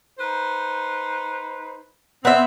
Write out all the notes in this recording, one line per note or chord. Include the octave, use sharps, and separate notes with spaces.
D#4 B4 C5
B3 C4 E5